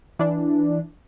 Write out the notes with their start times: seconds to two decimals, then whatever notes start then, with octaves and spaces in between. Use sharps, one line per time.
0.19 E3 D4